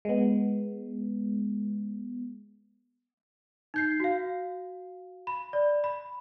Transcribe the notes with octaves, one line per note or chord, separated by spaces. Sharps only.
G#3 B3
D#4 G6 C7
F#4 F5
B5
D5
B5